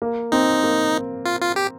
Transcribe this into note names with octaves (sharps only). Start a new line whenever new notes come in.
A#3
C4 D#4
A#3
F4
F4
G4